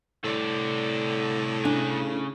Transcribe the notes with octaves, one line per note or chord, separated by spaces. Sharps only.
C2 A2 C3 A4 D5
C#3 D4 G#5